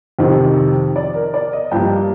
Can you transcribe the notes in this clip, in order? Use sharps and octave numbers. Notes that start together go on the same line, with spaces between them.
F2 C3 D#3 D#5
D5
A#4
D5
D#5
G2 F3 A#3 G5